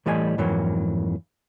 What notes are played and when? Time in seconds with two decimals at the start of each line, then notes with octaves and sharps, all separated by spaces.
0.06 A2 E3 G3 A3 D#5 G#5
0.38 F2 G#2 E3 F#3 A#3